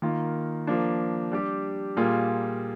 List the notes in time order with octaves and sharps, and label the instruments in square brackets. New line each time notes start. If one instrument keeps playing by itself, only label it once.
[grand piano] D#3 A#3 F4
F3 A#3 D4
G3 D4 G4
A#2 G3 A#3 F4 G#4